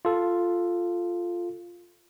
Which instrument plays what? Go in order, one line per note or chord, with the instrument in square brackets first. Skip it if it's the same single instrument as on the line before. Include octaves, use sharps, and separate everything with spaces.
[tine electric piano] F4 A4